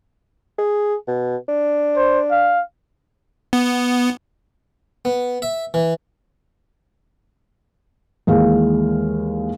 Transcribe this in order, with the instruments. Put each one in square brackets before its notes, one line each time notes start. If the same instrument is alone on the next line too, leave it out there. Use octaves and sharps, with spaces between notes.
[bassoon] G#4
B2
D4
[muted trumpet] C5
F5
[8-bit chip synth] B3
[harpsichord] B3
E5
E3
[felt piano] D#2 E3 G#3 G#4 F5